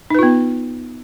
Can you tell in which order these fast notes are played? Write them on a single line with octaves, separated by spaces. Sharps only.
D#4 B4 F4 B3